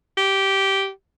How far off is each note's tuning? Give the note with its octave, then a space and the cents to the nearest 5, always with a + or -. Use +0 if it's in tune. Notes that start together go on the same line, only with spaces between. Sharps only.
G4 -10